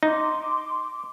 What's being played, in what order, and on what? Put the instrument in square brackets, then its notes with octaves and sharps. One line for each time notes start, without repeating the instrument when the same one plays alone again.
[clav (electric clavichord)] D#4 [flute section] C6 D6